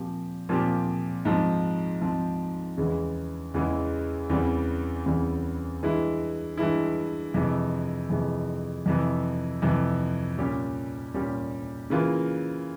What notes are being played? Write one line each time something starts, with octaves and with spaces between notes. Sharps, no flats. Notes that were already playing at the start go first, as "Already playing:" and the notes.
Already playing: A#2 F3 C4 G4
A#2 F3 C4 G4
G#2 F3 C4
G#2 F3 C4
E2 C#3 E3 G#3
E2 C#3 E3 G#3
E2 C#3 E3 G3 C4
E2 C#3 E3 G3 C4
G2 E3 G#3 E4
G2 E3 G#3 E4
F2 C3 E3 G#3
F2 C3 E3 G#3
F2 C3 E3
F2 C3 E3
A#2 G3 C#4 G4
A#2 G3 C#4 G4
C#3 E3 A#3 F4